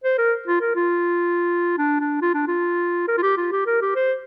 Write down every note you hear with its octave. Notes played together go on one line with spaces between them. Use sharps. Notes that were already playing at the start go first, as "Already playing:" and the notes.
C5
A#4
F4
A#4
F4
D4
D4
F4
D4
F4
A#4
F4
G4
F4
G4
A#4
G4
C5